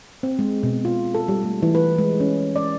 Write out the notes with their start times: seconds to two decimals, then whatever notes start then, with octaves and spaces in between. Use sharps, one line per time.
0.23 C4
0.39 G#3
0.63 B2
0.85 F4
1.14 A4
1.28 G3
1.44 A3
1.62 E3
1.75 B4
1.98 G#3
2.20 C#4
2.56 D5